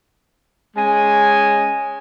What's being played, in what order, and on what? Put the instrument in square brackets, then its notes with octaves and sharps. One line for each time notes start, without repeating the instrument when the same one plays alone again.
[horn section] G#3 C#4 D#5 G#5